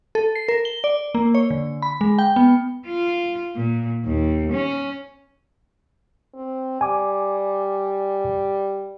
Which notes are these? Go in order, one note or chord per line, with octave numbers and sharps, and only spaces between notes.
A4
C7
A#4
G7
D5
A#3
C#5
D3
B5
G#3
G5
B3
F4
A#2
D#2
C#4
C4
G3 G#5 D6